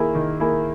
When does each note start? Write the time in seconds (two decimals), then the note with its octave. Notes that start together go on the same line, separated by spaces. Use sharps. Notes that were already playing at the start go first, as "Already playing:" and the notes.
Already playing: D#3 A#3 E4 G#4
0.15 D#3
0.40 A#3 E4 G#4